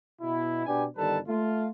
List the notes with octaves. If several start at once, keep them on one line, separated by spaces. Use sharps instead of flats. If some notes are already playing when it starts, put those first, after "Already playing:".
B2 E4
B2 B3 D4 G4 G#5
G1 D#3 G3 A4 B4 A5
A3 F4